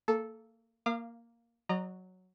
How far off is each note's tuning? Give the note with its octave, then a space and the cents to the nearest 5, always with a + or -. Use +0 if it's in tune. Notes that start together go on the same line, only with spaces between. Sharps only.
A#3 -30 A4 -10
A#3 +0 F5 -20 D6 +40
F#3 +0 D#5 -40 A#5 +0